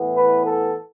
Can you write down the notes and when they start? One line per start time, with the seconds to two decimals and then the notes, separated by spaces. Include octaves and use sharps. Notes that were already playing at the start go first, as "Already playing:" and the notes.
Already playing: A2 E3 B3
0.17 B4
0.46 A4